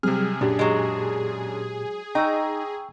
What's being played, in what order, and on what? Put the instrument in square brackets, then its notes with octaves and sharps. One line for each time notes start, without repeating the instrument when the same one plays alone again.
[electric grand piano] C3 F6 [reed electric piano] F#3 G3 C4 [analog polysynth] G#4
[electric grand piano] F#2 D4 [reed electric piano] A#2 G4
[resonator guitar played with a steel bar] F#3 G#3
[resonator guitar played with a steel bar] D#4 [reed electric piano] G5 C#6 E6 [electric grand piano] A#5